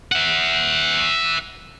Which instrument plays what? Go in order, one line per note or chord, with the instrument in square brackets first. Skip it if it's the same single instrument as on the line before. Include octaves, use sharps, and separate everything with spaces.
[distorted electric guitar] E5 F#5